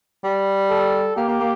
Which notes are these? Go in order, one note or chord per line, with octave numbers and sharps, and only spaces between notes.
G3
A4
A#3 G4
A#3
A#3